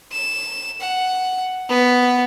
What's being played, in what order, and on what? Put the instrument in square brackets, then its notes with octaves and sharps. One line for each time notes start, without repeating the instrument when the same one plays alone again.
[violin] E7
F#5
B3